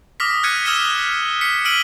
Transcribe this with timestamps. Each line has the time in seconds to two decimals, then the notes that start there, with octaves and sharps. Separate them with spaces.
0.20 D6 D#6 F6 A#6 B6
0.43 F6 F#6 G#6 B6 C#7 D#7
0.65 D#6 E6 G#6 B6 E7 G7
1.41 B6 C#7
1.65 E6 F6 D7 D#7 F#7 G7